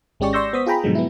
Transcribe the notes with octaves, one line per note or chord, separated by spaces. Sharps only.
G#1 G#3 C#4 G4 D5 C#6
D5 C6 C#6 E6 G6 A#6
B3 C5 D#6 B6
F4 G#4 G5 A#5 B5
G#2 B2 D3 F3 F#3 G#3
B3 E4